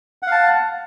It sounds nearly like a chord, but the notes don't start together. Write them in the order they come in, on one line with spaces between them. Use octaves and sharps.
F#5 F5 A5